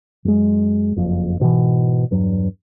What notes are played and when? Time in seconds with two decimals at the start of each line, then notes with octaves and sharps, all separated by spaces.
0.25 F#2 G#3
0.96 F#1 F2
1.40 G#2 B2 D#3 E3
2.11 E2 G2 F#3